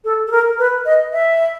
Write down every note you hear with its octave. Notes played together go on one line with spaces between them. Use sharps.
A4
A4
A#4
B4
D#5
E5